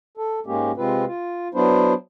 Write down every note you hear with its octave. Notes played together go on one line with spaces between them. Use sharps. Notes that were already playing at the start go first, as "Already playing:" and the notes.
A4
G#2 G#3 A#3 C#4 G4
C3 G#3 C4 F4 B4
F4
F#3 B3 D4 E4 C5